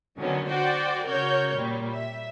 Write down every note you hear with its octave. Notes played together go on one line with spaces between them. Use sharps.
D3 D#3 F#3 B3 C#4
F#4 C5 D5 G5
C#3 F#4 A#4 C#5 G6
A#2 G3
E5